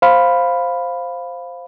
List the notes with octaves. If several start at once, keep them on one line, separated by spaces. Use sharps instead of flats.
C5 F5 B5